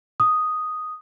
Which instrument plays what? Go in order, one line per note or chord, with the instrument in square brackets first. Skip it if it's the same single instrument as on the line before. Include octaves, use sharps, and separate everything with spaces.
[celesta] D#6